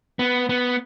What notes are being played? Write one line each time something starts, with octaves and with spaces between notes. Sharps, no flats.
B3
B3